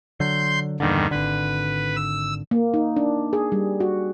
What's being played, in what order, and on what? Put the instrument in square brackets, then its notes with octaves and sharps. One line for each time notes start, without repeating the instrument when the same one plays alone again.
[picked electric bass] D3 F#3 [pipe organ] C6 G6
[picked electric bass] E2 A#2 D3 [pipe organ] G2 D#3
[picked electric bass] G#1 D3 [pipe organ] B4
[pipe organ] E6
[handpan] A#3
D#4
D4
G#4
G3
F#4